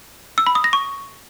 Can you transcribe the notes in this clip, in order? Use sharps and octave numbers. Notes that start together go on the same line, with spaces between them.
E6
B5
D#6
A#6
C#6